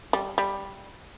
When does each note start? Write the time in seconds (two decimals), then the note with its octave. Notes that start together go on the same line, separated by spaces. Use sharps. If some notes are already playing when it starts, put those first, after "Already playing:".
0.13 G3
0.38 G3